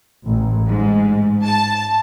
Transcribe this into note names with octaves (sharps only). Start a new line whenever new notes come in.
A1
G#2
A5